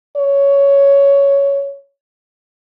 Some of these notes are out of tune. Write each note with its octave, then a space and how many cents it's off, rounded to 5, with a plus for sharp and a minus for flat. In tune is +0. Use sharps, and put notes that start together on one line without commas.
C#5 +10